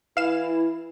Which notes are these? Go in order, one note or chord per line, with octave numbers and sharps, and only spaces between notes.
E3 E4 F5 E7